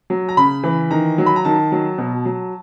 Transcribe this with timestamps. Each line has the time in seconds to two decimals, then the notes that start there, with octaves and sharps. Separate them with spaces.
0.10 F#3
0.29 A#5
0.37 C#3 B5
0.63 E3
0.91 D#3 A#5
1.18 F#3
1.26 B5
1.36 A#5
1.45 D#3 A5
1.72 F#3
1.98 B2
2.25 F#3